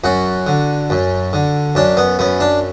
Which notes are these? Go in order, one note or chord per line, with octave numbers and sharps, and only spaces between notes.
F#2 F#4
D3
F#2
D3
F#2 D4
B3
F#2 B3
D4